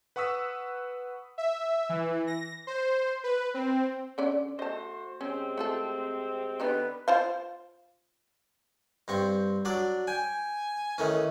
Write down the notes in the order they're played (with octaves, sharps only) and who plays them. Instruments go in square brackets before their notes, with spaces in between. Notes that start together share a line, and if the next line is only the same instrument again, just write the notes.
[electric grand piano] B4 F#5 C#6 D#6 E6 B6
[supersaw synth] E5
E3
A#6
C5
B4
C4
[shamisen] D3 C#4 D5
[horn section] A3 F#4 C5 [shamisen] D#5 A5
[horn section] C3 G#3 C4 [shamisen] C#4
[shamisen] A3 F4 A4
[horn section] D3 B3 [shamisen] D4 D#4 G4 [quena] B4
[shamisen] F4 C5 F5
[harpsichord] G2 C4 C#6
F#3 D4 D5
[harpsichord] G5 [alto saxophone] G#5
[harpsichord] D#3 A3 C#4 [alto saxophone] E3